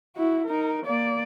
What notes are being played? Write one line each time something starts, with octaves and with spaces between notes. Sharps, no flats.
E4 F#4
D#4 A#4
A#3 D5